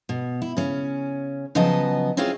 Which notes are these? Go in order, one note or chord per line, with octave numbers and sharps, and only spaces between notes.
B2
E4
C#3 C#4
C#3 F3 F#3 B3 D#5 A5
C4 C#4 E4 F4 G#4 C#5